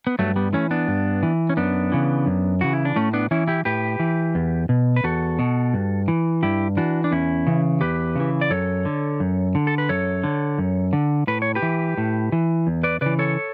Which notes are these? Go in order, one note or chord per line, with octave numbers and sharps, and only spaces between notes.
B3
G2 F#3 A3
G3 B3
E3 A3 C#4
B3 D4
G2
E3
C#4
F#2 B3 D4
C#3 E3
F#2
C#3 E3 F#4
E4
D4
A2 A3 C#4
B3 D4
E3 C#4 E4
E4 G4
A2 G4 B4
E3
E2
B2
B4
E2 F#4 A4
B2
G2
E3
G2 E4 G4
E3 D4 F#4
D4
E2 C#4 E4
C#3 E3
E2 G4 B4
C#3 E3
D5
F#2 A4 C#5
D3
F#2
D3
A4
B4
F#2 A4 C#5
D3
F#2
D3
A2 B4
C#5
G4 B4
E3
A2
E3
E2
B4 D5
C#3 E3 B4 D5
A4 C#5